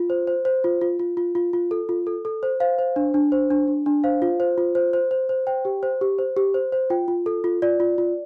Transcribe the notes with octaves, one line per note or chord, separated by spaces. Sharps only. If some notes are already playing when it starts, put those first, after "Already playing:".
Already playing: F4
C5
C5
C5
F4
F4
F4
F4
F4
F4
A4
F4
A4
A4
C5
C5 F5
C5
D4
D4
C5
D4
D4
D4
C5 F5
F4
C5
F4
C5
C5
C5
C5
C5 G5
G4
C5
G4
C5
G4
C5
C5
F4 G5
F4
A4
F4
F4 D5
F4
F4